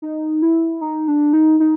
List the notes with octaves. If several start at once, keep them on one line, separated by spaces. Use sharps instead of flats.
D#4
E4
D#4
D4
D#4
D#4